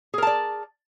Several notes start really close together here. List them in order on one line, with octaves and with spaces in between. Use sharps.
G#4 A#4 A5 D5